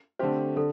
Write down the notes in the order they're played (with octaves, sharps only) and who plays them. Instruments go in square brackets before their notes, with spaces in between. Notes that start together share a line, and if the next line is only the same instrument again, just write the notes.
[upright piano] D3 A3 C4 G4 [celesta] C5
[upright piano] D3 [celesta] A4